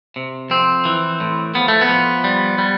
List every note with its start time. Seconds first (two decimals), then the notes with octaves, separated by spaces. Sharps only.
0.16 C3
0.50 F2 C4
0.85 E3
1.20 A2
1.55 F3 B3
1.68 A3
1.81 B3
1.89 F3
2.24 G3
2.58 G3